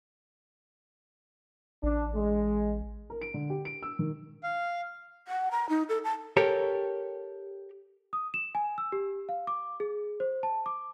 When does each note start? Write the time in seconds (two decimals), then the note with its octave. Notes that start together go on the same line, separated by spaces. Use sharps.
1.83 A1 D4
2.15 G#3
3.10 A#4
3.21 D7
3.34 D3
3.50 G4
3.65 D7
3.83 E6
3.99 D#3
4.43 F5
5.28 F#5
5.51 A#5
5.69 D#4
5.89 A4
6.04 A5
6.37 G4 A4 A#4 C#5
8.13 D#6
8.34 E7
8.55 G#5
8.78 E6
8.92 G4
9.29 F5
9.47 D6
9.80 G#4
10.20 C5
10.43 A5
10.66 D6